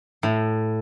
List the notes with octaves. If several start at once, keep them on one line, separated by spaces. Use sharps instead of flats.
A2